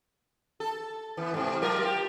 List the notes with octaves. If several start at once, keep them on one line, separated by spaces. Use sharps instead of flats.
A4
E3 B3
G#2 C3
F#3 F4 A#4
G4